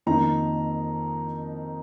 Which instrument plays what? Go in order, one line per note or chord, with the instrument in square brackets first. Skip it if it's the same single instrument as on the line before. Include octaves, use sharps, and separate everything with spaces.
[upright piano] F2 D#3 A#3 D#4 A#5